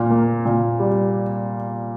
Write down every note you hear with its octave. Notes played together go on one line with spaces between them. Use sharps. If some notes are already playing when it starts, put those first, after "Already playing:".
Already playing: A#2
A#3
A#2
G3